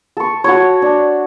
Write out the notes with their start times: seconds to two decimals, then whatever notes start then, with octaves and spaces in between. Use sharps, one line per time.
0.17 A4 C#6
0.44 F#4 A4 C#5
0.82 D4